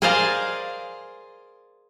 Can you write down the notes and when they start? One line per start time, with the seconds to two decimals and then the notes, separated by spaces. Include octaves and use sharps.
0.02 G#4 A#4 C5 D5 D#5 F5